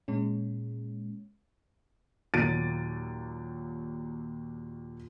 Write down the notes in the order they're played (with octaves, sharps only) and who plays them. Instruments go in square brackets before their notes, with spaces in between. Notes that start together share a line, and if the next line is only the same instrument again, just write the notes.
[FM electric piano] A#2 G#3 C#4
[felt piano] D#2 A#2 F#3 A6 D7 D#7